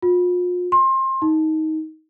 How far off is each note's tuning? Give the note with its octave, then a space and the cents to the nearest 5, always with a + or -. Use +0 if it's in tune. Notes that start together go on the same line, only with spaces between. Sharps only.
F4 +40
C6 +25
D#4 +20